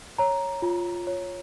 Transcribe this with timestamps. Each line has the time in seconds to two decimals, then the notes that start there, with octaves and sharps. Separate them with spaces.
0.18 C#5 A#5
0.62 F4
1.07 C#5